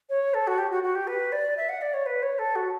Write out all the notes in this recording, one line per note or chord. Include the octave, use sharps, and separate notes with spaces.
C#5
A4
F#4
G4
F#4
F#4
G4
B4
D5
E5
F#5
D5
C#5
B4
C#5
A4
F#4